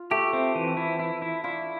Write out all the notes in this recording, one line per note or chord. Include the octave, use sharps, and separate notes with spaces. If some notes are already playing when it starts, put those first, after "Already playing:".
Already playing: F4
A3 G4
C4
E3
E4
E4
E4
D4 E4 F4